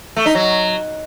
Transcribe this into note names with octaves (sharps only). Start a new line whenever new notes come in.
A3
D#4
F#3